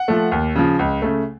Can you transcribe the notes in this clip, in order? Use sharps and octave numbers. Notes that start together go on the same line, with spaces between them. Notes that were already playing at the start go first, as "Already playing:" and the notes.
Already playing: F#5
F3 A3
D#2
C#3 F3
C#2
C#3 A3